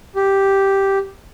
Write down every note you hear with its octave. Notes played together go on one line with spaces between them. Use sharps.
G4